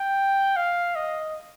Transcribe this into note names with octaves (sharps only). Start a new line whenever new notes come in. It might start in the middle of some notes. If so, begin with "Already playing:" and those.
Already playing: G5
F5
D#5